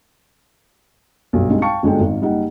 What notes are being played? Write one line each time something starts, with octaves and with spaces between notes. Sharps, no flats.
B1 G2
G3 G#3 C4 D4 D#4
F5 G5 A5 C#6 C#7
G1 G#3 D4 F#4 A4 G5
G#1 D#4
F#1 G3 D#4 G4 F#5